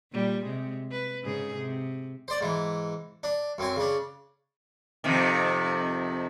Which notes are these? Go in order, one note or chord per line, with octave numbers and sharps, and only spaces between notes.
A#2 G3
C3 G#3
B4
G#2 C#3 G#4
C3
C5 D5
G#2 E3
D4
F#2 C4 G#5
C#3 D4
F2 C3 D#3